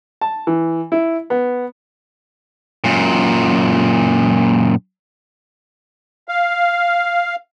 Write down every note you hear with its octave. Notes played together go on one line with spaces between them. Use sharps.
A5
E3
E4
B3
F#2 A#2
F5